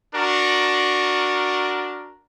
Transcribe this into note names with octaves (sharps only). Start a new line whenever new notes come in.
D4 F#4 A#4